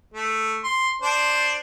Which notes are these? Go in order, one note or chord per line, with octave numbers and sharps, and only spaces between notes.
A3
C6
D4 C5